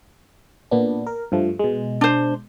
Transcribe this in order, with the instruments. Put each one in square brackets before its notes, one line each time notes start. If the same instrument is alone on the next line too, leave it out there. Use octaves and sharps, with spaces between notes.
[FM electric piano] A#2 B3 D4
A#4
G2 F3 A3
B2 G#3
[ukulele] D4 C5